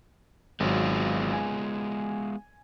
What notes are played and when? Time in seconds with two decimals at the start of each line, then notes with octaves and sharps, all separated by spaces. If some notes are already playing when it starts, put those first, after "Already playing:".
0.60 G#1 F#3 G#3 B3 F4
1.33 G#5